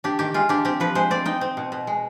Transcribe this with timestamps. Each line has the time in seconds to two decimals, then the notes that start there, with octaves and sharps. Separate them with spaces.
0.04 D4 G4
0.19 D#3 G4
0.34 G#3 F4
0.49 D4 G4
0.65 C4 G4
0.80 F3 B4
0.95 G#3 C5
1.11 C4 D5
1.25 D#4 G5
1.41 C4
1.57 B2
1.72 B2
1.87 G#3